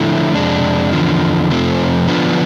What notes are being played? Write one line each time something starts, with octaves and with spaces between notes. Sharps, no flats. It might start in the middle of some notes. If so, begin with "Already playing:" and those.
Already playing: D3 F3 A3 E4
F2 C3 G#3 D4
E2 D3 F3
F2 C3 F3 A3 C4
D3 F3 B3 D4 F4